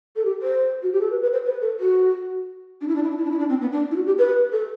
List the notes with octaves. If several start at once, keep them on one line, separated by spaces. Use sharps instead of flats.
A4
G4
C5
F#4
G4
A4
B4
B4
C5
B4
A4
F#4
D4
E4
D4
E4
D4
E4
D4
E4
D4
C4
B3
D4
E4
F#4
G4
B4
A4